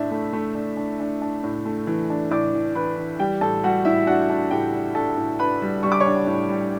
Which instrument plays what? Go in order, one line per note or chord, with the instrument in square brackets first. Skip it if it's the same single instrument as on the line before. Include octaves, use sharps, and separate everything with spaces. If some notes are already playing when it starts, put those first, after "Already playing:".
Already playing: [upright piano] A2 D4 E5
A3
A3
D4
D4
D4
D4
A2
A3
E3
D4
A2 D5 D6
E3
E3 B4 B5
E3
G3 G4 G5
A2 A4 A5
G3 F#4 F#5
A2 E4 E5
D4 F#4 F#5
D4
A2 G4 G5
D4
D4 A4 A5
A2
D4 B4 B5
G3
G3 C#6
D6
C#5 C#6
D4
A2
G3